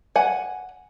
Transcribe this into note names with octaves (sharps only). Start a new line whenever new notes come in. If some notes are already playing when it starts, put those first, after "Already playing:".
F#5 G#5